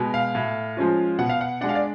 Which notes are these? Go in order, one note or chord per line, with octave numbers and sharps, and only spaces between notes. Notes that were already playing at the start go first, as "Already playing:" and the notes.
Already playing: B2 G#3
F5
A2
F3 G#3 C#4 F4
B2 F#5
F5
F#5
G#3 D4 F#5
F5
D5